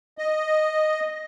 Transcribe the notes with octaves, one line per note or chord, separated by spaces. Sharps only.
D#5